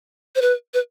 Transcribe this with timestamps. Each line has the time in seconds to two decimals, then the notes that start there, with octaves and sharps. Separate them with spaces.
0.36 C5
0.42 B4
0.74 B4